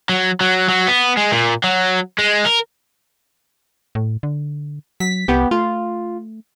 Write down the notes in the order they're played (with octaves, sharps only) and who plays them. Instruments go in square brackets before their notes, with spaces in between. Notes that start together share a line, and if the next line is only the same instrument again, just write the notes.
[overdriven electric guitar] F#3
F#3
F#3
B3
G#3
A#2
F#3
G#3
A#4
[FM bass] A2
D3
[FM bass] F#3 [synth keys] B6
[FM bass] C2 [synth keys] B3 G4
[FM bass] A3 [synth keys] F4